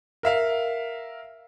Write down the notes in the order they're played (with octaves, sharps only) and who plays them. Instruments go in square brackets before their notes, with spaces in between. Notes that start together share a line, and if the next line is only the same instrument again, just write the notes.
[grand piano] A#4 E5 F5